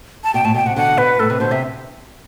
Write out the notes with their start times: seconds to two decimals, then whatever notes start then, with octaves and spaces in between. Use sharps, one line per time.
0.24 A5
0.34 B2 G5
0.45 A2 A5
0.54 B2 G5
0.66 C3 F#5
0.76 B2 D3 F#5
0.97 B2 B4
1.20 A2 A4
1.30 C3 B4
1.40 B2 D3 C5
1.51 C3 E5